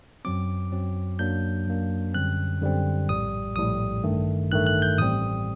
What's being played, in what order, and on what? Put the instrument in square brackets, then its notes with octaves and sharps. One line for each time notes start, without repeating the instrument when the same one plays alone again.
[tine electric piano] F#2 F#3 C4 D6
F#2 F#3 C4
F#2 F#3 A#3 D4 G6
F#2 F#3 A#3 D4
F#2 D3 G3 C4 F#6
F#2 D3 G3 C4
A#1 A2 G3 D#6
A#1 A2 G3 D#6
A1 G2 D#3 A3
A1 G2 D#3 A3 F#6
F#6
G6
A1 A2 G3 C4 D#6